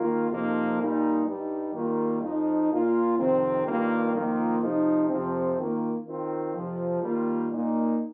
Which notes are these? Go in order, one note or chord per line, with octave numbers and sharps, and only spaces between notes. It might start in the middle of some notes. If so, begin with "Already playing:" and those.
Already playing: D#3 A#3 F4
F2 C3 F3 A#3 D#4
A#2 G3 D#4
G2 G3 D#4
D#3 G3 A#3 F4
F2 F3 D#4
A#2 A#3 F4
F2 C3 D#3 C4
G2 D#3 G3 A#3 F4
F2 D#3 A#3 F4
C3 F3 D#4
F2 C3 F3 C4
D#3 A#3 F4
D#3 C4 F4
F2 C3 F3
D#3 G3 A#3 F4
A#2 A#3 D#4